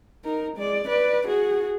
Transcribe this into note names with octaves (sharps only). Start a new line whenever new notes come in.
D#4 A#4
G#3 D5
B4 D5
F#4 G#4